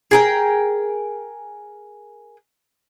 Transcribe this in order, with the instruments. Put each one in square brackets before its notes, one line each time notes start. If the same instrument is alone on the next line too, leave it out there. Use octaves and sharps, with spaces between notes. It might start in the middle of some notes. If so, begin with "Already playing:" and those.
[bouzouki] G#4 A#4 G5